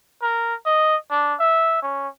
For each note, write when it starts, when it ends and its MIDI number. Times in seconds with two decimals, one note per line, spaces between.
0.22 0.55 70
0.66 0.96 75
1.11 1.34 62
1.40 1.80 76
1.82 2.08 61